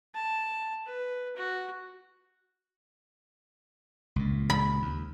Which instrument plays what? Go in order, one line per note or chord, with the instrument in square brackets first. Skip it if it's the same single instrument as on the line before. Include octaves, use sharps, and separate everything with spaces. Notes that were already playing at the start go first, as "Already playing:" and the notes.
[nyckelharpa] A5
B4
F#4
[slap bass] C#2 A#2
[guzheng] B5
[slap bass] D#2